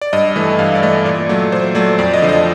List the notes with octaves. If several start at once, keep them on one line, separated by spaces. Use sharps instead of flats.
D5
G2 D#5
E3 A3
G2 F5
D5
E3 A3 D#5
A#2 D5
F#3 A3
A#2 C5
F#3 A3 D5
F2 D5
D#5
D3 F3
D#5